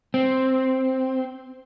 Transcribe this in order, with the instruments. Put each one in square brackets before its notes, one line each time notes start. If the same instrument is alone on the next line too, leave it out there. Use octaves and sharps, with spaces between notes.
[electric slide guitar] C4